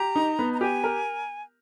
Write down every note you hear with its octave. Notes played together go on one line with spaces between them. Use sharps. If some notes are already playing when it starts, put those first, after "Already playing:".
Already playing: G4 A#5
D#4
B3
A#5
G4 G#5
A#4